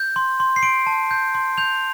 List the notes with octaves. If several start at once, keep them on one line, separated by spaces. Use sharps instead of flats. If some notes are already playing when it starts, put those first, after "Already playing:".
Already playing: G6
C6
C6
C7
C6 D7
A5
G6
C6
G6 F7